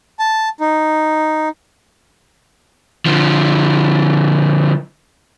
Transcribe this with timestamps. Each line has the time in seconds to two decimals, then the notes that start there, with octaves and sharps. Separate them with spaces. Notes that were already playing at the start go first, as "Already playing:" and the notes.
0.19 A5
0.60 D#4
3.06 D3 F3